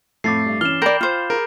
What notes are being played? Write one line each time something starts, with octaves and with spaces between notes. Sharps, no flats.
F2 A2 A3 D6 A6 C7
G2
E3 C#4 F6 E7 G7
A#4 D5 G5 B5 G6
F4 C5
G#4 A#4